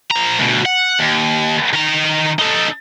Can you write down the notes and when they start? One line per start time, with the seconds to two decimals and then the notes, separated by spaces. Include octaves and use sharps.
0.11 F3 A#5
0.40 D2 B2
0.66 F#5
1.00 D#2
1.73 D#3 A#5
2.39 D#4 A4